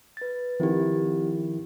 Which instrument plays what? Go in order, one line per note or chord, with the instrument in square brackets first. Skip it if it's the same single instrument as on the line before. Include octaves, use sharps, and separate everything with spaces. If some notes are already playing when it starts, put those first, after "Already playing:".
[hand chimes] B4 A6
[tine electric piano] D#3 F3 E4 [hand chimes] C4 G4